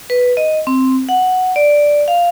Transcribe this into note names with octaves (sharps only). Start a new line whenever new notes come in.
B4
D#5
C4
F#5
D5
F5